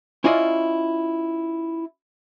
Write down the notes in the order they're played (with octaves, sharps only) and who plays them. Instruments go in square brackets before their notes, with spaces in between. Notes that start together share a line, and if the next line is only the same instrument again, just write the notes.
[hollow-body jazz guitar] C#4 E4 F4 D5 D#5